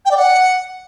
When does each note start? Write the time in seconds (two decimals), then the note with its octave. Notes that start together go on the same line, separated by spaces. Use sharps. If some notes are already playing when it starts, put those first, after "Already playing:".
0.05 G5
0.11 D5
0.17 F#5